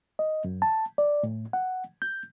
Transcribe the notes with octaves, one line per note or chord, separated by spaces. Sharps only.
D#5
F#2
A5
D5
A2
F#5
G6